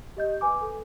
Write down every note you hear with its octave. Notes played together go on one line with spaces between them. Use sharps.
G4 D#5 G6
B4 G#5 D6
A4